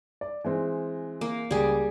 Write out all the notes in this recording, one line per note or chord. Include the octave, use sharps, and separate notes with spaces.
D5
E3 G#3 C4
A#3
C#2 G3 G#4